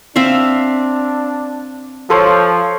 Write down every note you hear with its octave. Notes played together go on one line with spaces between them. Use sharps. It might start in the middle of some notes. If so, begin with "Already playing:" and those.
C4 D4 E5 F5
F3 A4 C5 C#5